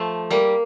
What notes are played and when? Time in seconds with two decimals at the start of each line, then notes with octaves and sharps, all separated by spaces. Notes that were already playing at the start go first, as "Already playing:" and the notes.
Already playing: F3 A3
0.30 G3 A#3